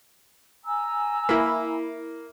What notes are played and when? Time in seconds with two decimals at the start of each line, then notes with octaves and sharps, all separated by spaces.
0.64 G#5 A#5 E6
1.29 A#3 E4 B5